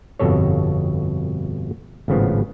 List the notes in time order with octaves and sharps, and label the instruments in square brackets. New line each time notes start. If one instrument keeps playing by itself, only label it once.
[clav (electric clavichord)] G1 F2 B2 A4 C#5
G#1 A2 C#3 F3 B3